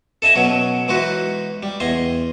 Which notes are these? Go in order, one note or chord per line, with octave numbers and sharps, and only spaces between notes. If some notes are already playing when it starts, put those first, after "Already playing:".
A4 D#5 E5 G#5
B2 F#3 C#4
E3 G#3 D#4 F#4 B4
G3
E2 D#5 G#5 C6